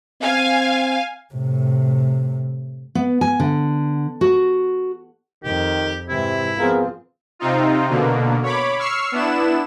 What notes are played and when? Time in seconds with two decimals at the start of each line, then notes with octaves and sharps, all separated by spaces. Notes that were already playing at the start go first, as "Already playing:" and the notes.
0.22 C4 F5 G#5
1.34 A2 C3
2.95 B3
3.21 G#5
3.40 D3
4.21 F#4
5.44 F2 D#3 G4
6.09 G#2 C3 E3 E4
6.58 F3 B3 C4 F4 G#4 A#4
7.39 C3 C4 D#4 F4
7.89 B2 D3 A#3
8.43 C#5 B5 D6
8.79 C#6 E6 F6 C7
9.12 B3 D4 E4 E7